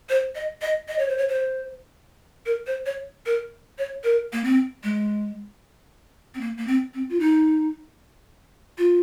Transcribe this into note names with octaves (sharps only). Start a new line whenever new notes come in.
C5
D#5
D#5
D#5
C#5
C5
C#5
C5
A#4
C5
C#5
A#4
C#5
A#4
A#3
C4
G#3
C4
A#3
A#3
C4
C4
F4
D#4
F4